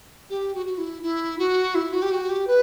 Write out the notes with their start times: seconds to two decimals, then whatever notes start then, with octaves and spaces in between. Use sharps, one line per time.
0.29 G4
0.54 F#4
0.66 F#4
0.77 E4
1.02 E4
1.38 F#4
1.74 E4
1.92 F#4
2.02 G4
2.11 F#4
2.29 G4
2.47 B4